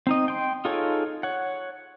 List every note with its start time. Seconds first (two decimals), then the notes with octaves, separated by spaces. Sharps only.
0.07 C4 D#4 D#5
0.28 G5 C6
0.65 D#4 F4 G#4 A4 C#5
1.23 C#5 F#5